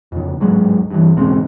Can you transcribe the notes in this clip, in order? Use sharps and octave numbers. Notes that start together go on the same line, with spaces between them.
F2 C#3
D1 G#2 F#3 G#3
G2 E3
E1 G#2 C#3 C4